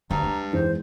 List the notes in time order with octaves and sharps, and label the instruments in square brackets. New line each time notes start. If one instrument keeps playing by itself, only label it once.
[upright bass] D2 [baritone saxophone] G2 [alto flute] A#5
[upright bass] G#3
[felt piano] E2 [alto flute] C5